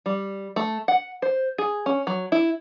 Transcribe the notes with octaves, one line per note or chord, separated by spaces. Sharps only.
G3
A3
F#5
C5
G#4
C#4
F#3
E4